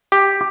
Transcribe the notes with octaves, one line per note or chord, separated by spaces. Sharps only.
G4